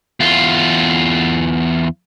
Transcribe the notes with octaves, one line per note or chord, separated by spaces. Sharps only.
E2 F4